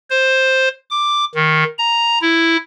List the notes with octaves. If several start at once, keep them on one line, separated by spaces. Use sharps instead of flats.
C5
D6
D#3
A#5
E4